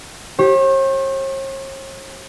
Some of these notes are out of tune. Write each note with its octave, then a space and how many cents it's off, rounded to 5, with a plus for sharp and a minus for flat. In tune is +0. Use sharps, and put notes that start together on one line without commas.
G4 +0 C#5 -45